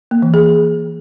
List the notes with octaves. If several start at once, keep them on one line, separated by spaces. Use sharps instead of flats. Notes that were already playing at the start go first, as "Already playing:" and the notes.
A#3
E3
G#4